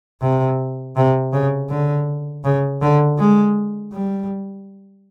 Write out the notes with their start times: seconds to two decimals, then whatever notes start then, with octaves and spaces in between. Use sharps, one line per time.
0.22 C3
0.97 C3
1.33 C#3
1.70 D3
2.44 C#3
2.82 D3
3.19 G#3
3.93 G3